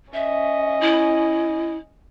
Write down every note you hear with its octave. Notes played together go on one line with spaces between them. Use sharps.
C#4 D#5 E5
E4